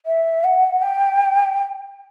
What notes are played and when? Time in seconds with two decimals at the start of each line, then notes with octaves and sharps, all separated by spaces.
0.06 E5
0.44 F#5
0.82 G5